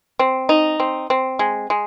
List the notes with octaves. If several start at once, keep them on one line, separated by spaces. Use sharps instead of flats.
C4
D#4
C4
C4
G#3
G#3